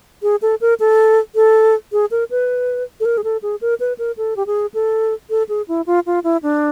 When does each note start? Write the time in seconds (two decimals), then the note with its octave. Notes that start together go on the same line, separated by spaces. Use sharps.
0.23 G#4
0.42 A4
0.61 A#4
0.80 A4
1.35 A4
1.92 G#4
2.11 A#4
2.31 B4
3.00 A4
3.05 A#4
3.18 G#4
3.24 A4
3.43 G#4
3.61 A#4
3.80 B4
3.98 A#4
4.17 A4
4.37 G4
4.47 G#4
4.74 A4
5.30 A4
5.49 G#4
5.68 E4
5.86 F4
6.06 F4
6.24 E4
6.43 D4